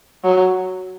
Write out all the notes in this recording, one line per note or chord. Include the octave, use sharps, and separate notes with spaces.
F#3